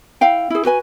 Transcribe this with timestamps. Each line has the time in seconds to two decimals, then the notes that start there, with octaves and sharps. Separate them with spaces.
0.21 E4 F5 G5
0.50 E4 G#4
0.65 F#4 B4 G#5